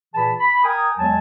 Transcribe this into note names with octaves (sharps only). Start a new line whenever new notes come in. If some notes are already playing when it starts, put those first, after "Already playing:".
A#2 E3 G#4 B4 A5 B5
B5
A#4 G5 G#5 A#5 D#6
E2 F#3 G#3 G#5 A5